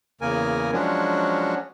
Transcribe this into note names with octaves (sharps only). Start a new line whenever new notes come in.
E2 C#3 A#3 A#4 G#5
F3 F#3 G#3 C#4 D4 F#4